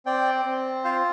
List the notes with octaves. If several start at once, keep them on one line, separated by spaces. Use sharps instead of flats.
C4 D5 G5
C4
F4 C5 F5